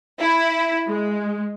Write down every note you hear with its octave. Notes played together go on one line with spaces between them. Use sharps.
E4
G#3